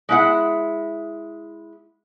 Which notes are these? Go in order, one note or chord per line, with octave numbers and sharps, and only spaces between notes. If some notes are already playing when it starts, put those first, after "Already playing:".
G#3 E4 F#5